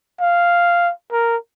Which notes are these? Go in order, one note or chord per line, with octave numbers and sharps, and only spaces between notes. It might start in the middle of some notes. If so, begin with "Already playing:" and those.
F5
A#4